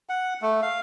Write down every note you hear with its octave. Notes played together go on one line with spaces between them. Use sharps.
F#5
A3
F5